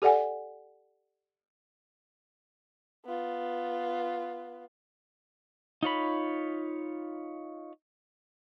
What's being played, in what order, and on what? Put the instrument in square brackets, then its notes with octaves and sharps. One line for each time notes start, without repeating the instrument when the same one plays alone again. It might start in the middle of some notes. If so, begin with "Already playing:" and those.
[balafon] G4 A4 D5 F#5 G#5
[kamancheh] B3 F4
[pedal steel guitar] D#4 F4 C#5 B5